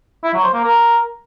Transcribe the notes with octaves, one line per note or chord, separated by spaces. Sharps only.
E4
F#3
C5
A#3
A#4